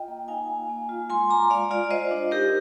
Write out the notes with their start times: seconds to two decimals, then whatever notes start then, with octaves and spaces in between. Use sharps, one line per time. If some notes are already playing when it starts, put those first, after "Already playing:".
Already playing: F4 D#5 G5
0.08 A#3
0.28 D#4 F5 G#5
0.49 A#3
0.69 A#3
0.89 F4
1.10 G#3 G#5 C6
1.29 F4 A#5 D6
1.50 G#3 D5 F5
1.71 F4 D5 F5
1.91 F4 C5 D#5
2.11 D4
2.31 D#4 G4 A#4